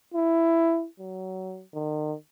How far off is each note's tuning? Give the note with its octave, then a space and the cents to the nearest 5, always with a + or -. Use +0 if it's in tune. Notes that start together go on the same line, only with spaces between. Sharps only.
E4 +10
F#3 +20
D#3 -35